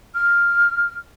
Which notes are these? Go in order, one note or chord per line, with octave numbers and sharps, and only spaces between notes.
F6